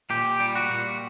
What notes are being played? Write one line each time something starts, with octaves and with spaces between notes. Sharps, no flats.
A#2 G4
G3
F#4
A#2